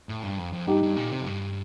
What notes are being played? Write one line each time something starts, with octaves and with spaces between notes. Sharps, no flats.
A2
G2
F2
F2
G2 D#4 G4
G2
A#2
C3
F2
G2